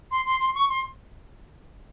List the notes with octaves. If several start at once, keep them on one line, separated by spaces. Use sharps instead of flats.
C6
C6
C6
C#6
C6